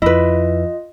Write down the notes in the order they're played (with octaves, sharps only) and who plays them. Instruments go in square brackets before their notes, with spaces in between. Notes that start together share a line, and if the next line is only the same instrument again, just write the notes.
[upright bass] F2 [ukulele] E4 B4 [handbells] F4 D#5